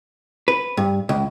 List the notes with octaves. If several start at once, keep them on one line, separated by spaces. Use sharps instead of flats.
B4
G2
C#2